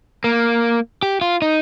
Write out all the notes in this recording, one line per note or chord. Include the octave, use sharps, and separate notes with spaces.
A#3
G4
F4
D#4